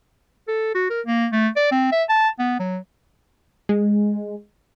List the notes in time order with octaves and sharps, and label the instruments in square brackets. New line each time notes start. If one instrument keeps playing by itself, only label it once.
[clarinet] A4
F#4
A#4
A#3
A3
D5
C4
E5
A5
B3
F#3
[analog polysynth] G#3